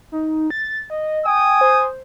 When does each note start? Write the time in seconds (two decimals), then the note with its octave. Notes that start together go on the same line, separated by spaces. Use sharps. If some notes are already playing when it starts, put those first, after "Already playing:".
0.12 D#4
0.50 A6
0.90 D#5
1.26 G5 G#5 D#6
1.61 C5